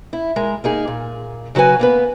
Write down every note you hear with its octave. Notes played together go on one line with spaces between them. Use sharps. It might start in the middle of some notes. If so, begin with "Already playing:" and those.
E4
G#3 A#4
A#3 D#4 G#4
A#2
C#3 F#3 F#4 B4 G#5
A#3 B3 B4